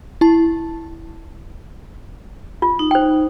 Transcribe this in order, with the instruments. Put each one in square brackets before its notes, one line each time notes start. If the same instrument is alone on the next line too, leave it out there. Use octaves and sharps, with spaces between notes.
[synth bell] E4 A5
[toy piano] F4
[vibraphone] D#4
[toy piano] C5 G5